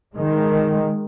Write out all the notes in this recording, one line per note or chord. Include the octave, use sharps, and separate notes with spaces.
D#3 G#3